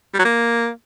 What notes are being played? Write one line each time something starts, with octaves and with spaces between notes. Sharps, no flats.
G3
F#3
A#3